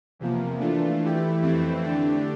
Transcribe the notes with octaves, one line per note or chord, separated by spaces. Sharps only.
E2 C3 F3 A#3
E3 A3 D4 F4
E3 A3 E4 G4
F2 E3 A3 C4 E4
D3 A3 D4 G4